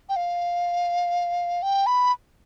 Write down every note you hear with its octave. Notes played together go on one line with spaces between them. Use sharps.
G5
F5
G5
B5